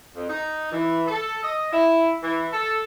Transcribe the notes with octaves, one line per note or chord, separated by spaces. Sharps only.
F2
D#4
E3
A4
D#5
E4
E3
A4